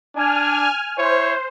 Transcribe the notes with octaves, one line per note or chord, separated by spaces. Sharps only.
D4 G#5 F6
E4 C5 C#5